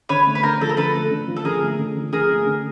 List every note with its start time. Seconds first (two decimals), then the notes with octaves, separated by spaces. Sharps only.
0.09 D3 B4 C#5
0.27 A3
0.35 B4
0.43 D3 A#4 C5
0.61 F3 A4
0.69 A#4
0.77 D3 A4 B4
0.94 A3
1.11 D3
1.28 F3
1.36 A4
1.45 D3 G#4 A#4
1.63 A3
1.79 D3
1.95 F3
2.12 D3 G#4 A#4
2.30 A3
2.46 D3